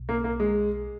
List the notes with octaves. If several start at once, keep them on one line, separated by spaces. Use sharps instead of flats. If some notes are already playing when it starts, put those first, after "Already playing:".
Already playing: B1
A#3
A#3
G#3